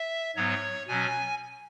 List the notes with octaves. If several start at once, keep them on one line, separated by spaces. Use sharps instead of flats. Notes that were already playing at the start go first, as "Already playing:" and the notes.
Already playing: E5
G#2 F#3 B3 C#5
B2 F#3 C#4 G#5